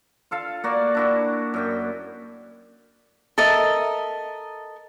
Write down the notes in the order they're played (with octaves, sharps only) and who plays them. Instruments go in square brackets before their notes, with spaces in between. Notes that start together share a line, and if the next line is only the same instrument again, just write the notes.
[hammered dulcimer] F4 A4 F5
A#3 F#4 D5
D4 E4 F#4
F#2 E5 G5
[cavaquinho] A4 A#4 D#5 E5